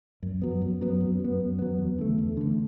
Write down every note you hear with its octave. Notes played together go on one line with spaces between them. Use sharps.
F#2
F#3 B3
F#2
F#3 B3
F#2
F#3 B3
F#2
F#3 B3
E2
D3 A3
E2
D3 A3